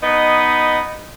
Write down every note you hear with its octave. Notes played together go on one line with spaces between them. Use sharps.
B3 D#4 D#5